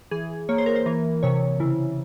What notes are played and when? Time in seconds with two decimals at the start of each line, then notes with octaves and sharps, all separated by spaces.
0.11 E3 G#4
0.49 A#3 C#5
0.58 C5
0.66 A#4
0.76 C5
0.86 E3 A#4
1.23 C3 C#5
1.60 C#3 E4